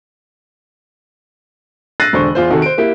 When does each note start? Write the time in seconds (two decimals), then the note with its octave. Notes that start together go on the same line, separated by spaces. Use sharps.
2.00 E6 F#6 A6 A#6 C7 D#7
2.13 E1 D3 C5 C#6
2.35 E2 F4 C5
2.50 C3 D#3 F#4 G#4 A4
2.62 C5 D7
2.78 A#3 E4 G4